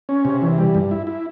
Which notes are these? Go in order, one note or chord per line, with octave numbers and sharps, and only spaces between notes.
C#4
C3
E3
G3
G2
E4
E4